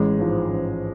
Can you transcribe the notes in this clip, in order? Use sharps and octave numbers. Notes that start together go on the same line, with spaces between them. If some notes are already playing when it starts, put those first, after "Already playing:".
Already playing: A1 G#3
G#2 F3
A1